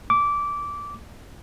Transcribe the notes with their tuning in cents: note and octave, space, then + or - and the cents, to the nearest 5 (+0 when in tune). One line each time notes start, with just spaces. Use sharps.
D6 -15